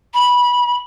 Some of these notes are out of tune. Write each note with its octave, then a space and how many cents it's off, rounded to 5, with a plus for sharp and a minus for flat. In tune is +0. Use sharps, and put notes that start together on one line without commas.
B5 -15